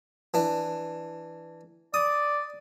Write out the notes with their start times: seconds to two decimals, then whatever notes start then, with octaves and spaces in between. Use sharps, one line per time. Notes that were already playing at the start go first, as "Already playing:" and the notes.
0.34 E3 D4
1.94 D5 D#6